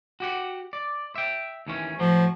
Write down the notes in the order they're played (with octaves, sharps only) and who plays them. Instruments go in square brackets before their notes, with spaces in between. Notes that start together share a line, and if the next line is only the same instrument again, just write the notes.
[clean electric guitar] F#4 G4 F#5
D5
E5 G5
D#2 E3 C#4
[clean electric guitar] A2 F#3 [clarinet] F3